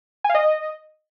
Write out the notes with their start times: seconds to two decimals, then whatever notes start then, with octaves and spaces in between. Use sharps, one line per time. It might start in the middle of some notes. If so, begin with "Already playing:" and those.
0.24 G#5
0.29 F5
0.35 D#5